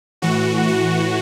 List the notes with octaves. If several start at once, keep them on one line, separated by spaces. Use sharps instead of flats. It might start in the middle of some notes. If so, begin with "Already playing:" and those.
A2 E3 F#4
F#4